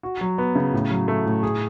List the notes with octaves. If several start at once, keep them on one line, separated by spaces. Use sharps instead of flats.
F#4
F#3
B3
C#3
A2
F#3
A3
A2
G#4